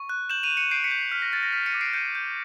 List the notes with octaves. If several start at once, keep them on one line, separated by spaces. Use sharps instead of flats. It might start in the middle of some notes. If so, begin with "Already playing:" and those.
Already playing: C#6
F#6
G6 E7 F#7
D#7 F7
G6
C#7 D#7
G6 C7 D7
B6 C#7
G6
C7
F6 B6
A#6
F6 A6
A#6
F6 B6
C#7 D#7
D6
C7 D7
G6 C#7 D#7
G6